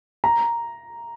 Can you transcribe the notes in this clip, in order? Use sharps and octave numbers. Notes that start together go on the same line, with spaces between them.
A#5